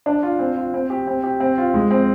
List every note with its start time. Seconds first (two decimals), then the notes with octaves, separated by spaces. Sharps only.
0.06 D4
0.23 F4
0.39 C4
0.56 F4
0.74 C4
0.90 G4
1.07 C4
1.24 G4
1.40 C4
1.58 F4
1.74 G#3
1.91 C4